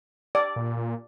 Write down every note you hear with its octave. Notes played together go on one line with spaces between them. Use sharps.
D5
A#2
A#2